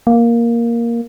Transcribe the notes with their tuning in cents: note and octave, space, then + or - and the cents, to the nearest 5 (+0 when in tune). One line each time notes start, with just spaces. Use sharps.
A#3 +5